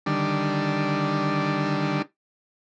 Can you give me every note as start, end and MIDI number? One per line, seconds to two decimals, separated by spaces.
0.06 2.02 50
0.06 2.02 51
0.06 2.02 55
0.06 2.02 62